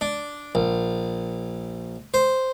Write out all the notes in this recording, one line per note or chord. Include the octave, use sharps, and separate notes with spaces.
D4
A#1
C5